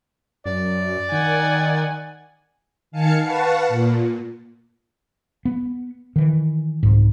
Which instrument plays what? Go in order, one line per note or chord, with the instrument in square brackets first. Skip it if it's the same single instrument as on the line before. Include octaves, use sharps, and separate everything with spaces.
[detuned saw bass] F#2 [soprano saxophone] D5
[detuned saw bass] D#3 [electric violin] F#5 G#5
[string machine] D#3 F5 G#5 A5 C#7
B4 F5 F#5 A5 C#6
A#2
[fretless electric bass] B3
D#3 E3
C2 G#2